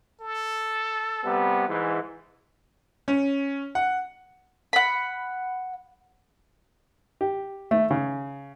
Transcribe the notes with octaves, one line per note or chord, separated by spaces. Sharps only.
A4
C3 G3 B3
G#2 E3
C#4
F#5
F#5 B5
G4
A3
C#3